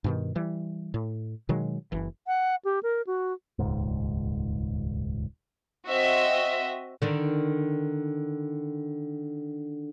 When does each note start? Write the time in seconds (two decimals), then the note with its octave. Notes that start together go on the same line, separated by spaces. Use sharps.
0.04 G2 B2 D#3
0.35 E3 G3
0.94 A2
1.49 B2 D#3 F#3 G#3
1.92 F#1 E3
2.27 F#5
2.65 G4
2.83 A#4
3.07 F#4
3.59 D#1 C#2 G#2
5.88 C4 F#4 D#5 E5
7.02 D3 D#3 D4